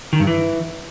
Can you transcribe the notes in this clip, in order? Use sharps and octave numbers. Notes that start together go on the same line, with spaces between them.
D#3
G2
E3